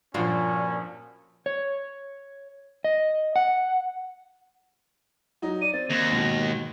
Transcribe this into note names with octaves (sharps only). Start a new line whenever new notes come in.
G2 A#2 F3 C#4 F4 F#4
C#5
D#5
F#5
F#3 D#4
D5 D#7
C4 A6
D#2 A#6
G#2 B2